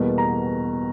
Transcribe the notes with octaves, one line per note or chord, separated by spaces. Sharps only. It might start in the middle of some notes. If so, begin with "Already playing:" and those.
Already playing: E2 B2 G3 A#3
A#5